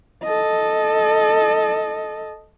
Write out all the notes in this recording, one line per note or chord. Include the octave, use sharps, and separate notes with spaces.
A4 D#5